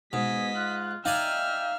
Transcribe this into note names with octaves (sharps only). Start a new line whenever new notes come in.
G#2 B2 G#4 D#5 B6
F4 F#6
D#4 D5 E5 F5 G5 G#5 F6